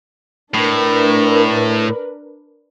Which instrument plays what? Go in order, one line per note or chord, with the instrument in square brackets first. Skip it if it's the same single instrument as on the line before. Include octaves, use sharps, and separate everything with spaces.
[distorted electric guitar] A2 [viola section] D4 A#4 B4